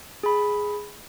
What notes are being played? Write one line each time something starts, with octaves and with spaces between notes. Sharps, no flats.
G#4 B5